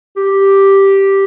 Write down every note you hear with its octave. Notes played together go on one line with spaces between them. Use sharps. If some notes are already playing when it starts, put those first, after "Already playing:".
G4